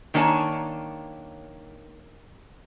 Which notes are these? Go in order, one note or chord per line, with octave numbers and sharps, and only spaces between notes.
D#3 A#3 D4 C#5 G#5 A5